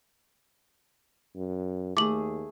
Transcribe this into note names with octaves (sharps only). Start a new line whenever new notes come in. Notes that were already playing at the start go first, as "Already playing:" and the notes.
F#2
D#2 A3 G#4 D6 F#7